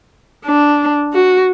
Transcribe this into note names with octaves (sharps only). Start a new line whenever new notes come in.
D4
F#4